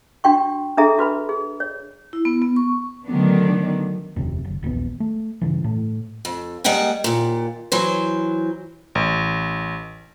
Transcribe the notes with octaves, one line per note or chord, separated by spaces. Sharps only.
D4 F#4 G5 C#6
D4 G#4 A4 E5 A#5
F#4 B4 B5
G#4
C#5
E4
B3
B3
C#6
D3 D#3 F#3 A3 B3 D4
F1 D#2 C3
F#1
E1 A#1 D#2 B3
A3
G2 C#3 E3
A2 A3
F2
G3 G#3 A#3 D#5 F#5 G5
D#2 A#2
E3 F#3 C5
A1